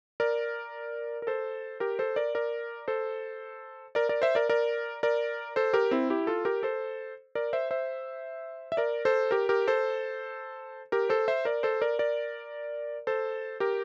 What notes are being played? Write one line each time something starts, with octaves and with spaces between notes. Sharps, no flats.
A#4 D5
A#4
A4 C5
G4 A#4
A4 C5
A#4 D5
A#4 D5
A4 C5
A#4 D5
A#4 D5
C5 E5
A#4 D5
A#4 D5
A#4 D5
A4 C5
G4 A#4
C4 E4
E4 G4
F4 A4
G4 A#4
A4 C5
A#4 D5
C5 E5
C5 E5
E5
A#4 D5
A4 C5
G4 A#4
G4 A#4
A4 C5
G4 A#4
A4 C5
C5 E5
A#4 D5
A4 C5
A#4 D5
A#4 D5
A4 C5
G4 A#4